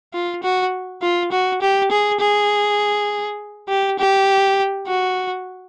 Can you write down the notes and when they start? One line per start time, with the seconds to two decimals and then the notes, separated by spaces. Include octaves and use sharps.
0.14 F4
0.43 F#4
1.02 F4
1.32 F#4
1.62 G4
1.91 G#4
2.21 G#4
3.69 G4
3.99 G4
4.87 F#4